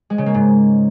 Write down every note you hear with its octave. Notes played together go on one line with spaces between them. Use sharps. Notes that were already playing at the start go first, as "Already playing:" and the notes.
G#3
C#3
A#3
G#2